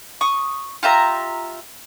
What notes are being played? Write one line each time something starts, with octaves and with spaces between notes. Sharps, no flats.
C#6 D#6
F4 G4 E5 A#5